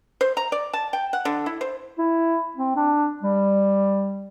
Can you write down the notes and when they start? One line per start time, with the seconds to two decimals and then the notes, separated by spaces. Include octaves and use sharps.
0.21 C5
0.37 A#5
0.52 D5
0.73 A5
0.93 G5
1.13 F#5
1.25 D3
1.46 E4
1.61 C5
1.98 E4
2.57 C4
2.76 D4
3.23 G3